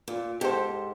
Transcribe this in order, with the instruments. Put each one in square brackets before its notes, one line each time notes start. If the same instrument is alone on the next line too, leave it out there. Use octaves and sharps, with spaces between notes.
[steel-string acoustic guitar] A#2
[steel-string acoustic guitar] G#2 [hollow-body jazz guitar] G4 A4 C5